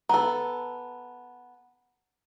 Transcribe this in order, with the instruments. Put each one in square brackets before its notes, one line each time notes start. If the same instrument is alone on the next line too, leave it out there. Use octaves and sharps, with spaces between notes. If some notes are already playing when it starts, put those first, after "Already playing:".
[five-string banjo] B3 A4 [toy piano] A#5